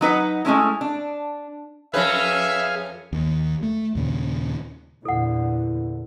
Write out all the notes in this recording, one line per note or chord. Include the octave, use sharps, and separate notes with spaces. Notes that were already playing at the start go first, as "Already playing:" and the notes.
F#3 D#4 B4 F#5
G#3 A3 C#4 E4
D4
F2 C#4 G#4 B4 E5 F5
D#2
A3
D#2 A#2 C#3
E2 A#2 D3 E4 A4 F#5